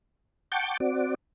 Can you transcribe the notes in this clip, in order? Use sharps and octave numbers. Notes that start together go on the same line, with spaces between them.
F#5 G5 A5 C#6 D6 G6
C4 F#4 D5